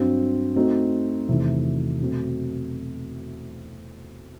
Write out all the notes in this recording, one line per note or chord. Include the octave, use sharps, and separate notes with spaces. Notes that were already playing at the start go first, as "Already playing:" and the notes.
Already playing: G2 F#3 C4
A3 C4 D#4 F#4
E2 C3 D#3 A3 E4
B2 F#3 A3 C4